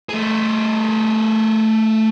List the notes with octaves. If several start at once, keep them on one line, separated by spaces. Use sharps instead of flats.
A3 G#4